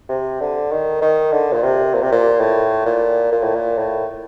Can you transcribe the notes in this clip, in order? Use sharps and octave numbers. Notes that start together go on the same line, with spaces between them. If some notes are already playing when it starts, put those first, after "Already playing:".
C3
D3
D#3
D#3
D3
A#2
C3
A#2
C3
A#2
A2
A#2
A#2
A2
A#2
A2